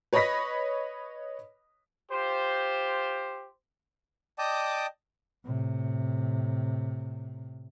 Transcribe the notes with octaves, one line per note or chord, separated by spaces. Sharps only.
B4 C#5 D#5 B5 A#6 B6
F4 G4 C5
D5 D#5 G5 A5 D6 D#6
A2 C3